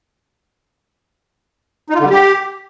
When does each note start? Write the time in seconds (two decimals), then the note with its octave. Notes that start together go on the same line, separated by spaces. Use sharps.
1.90 D#4
1.95 F4
2.00 D3
2.05 G3
2.10 G4